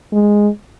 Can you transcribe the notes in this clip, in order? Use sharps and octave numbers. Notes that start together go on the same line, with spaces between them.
G#3